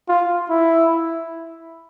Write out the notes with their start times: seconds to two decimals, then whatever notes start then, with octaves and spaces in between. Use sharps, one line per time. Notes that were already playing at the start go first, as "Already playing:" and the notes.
0.08 F4
0.49 E4